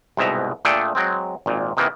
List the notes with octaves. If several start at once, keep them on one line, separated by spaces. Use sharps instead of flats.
C2 G#2 B2 E5 A#5
A#2 A3 D4 G#4 A4 G5
F#3 G#3 C4
G#1 A#2
C3 D#3 E3 A#3 B3